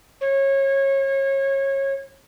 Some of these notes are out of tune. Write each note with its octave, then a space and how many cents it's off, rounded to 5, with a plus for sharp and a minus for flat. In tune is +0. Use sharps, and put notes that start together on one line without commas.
C#5 -25